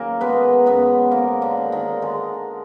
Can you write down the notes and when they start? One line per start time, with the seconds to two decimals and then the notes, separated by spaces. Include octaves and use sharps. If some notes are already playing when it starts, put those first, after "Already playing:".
Already playing: F#2 D#3 A#3 G#4 A#4
0.21 G#3 B3 B4
0.66 F#2 B3 B4
1.11 G#2 A#3 A#4
1.42 D3 D4
1.57 D#3
1.72 D#3 D#4
2.02 D3 G#3 D4